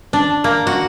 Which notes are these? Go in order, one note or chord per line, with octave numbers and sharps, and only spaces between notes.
D4
A#3
F#4